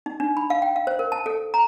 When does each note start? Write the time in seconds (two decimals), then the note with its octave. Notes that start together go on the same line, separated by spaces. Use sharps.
0.06 D#4
0.20 D4
0.37 B5
0.50 F5
0.62 G5
0.76 F5
0.87 C5
0.99 A#4
1.12 A5
1.26 A4
1.54 A#5